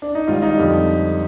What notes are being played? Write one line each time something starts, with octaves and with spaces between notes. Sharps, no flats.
D4
D#4
G#1 G#2 G3 F4
D#4
F2 D3 G3